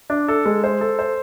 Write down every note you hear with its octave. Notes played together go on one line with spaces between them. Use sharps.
D4
A4
G#3
C5
A4
C5